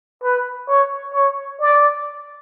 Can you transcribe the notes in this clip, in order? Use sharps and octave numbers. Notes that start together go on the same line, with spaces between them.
B4
C#5
C#5
D5